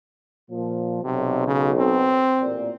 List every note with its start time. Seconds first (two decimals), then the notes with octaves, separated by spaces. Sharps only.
0.51 A#2 F3
1.04 B1 C3
1.47 C#3
1.79 C4
2.41 A1 A#2 D5